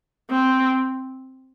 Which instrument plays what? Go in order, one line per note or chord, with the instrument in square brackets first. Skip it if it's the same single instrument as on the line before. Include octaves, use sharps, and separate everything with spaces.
[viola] C4